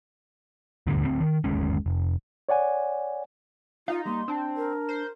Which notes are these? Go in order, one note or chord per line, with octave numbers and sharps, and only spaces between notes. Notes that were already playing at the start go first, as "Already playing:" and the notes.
D#1 D2 G2 D3
D2 G3 C4
D#3
G1 D#2 G#3 C#4
F1
C#5 D5 F#5 G#5
D#4 F4 F5
G3 A#3 C6
C4 D4 A5
A#4
C5